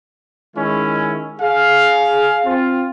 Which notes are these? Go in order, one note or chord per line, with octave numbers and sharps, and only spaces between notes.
D#3 G#3 C#4 E4
G#4 F5
C4 F4